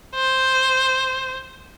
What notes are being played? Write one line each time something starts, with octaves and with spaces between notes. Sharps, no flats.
C5